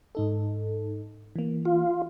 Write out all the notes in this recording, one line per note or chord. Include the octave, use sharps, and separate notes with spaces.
G#2 D#4 A4
E3 A#3
F4